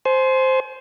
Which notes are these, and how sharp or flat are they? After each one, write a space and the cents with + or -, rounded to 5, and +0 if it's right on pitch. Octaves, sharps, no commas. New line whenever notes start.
C5 +0 G#5 +40